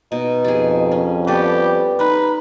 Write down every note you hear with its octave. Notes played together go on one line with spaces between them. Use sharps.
B2 D#4
F2 G4 G#4
C#4
G3 B3 G4 A4 B4
D#4 B4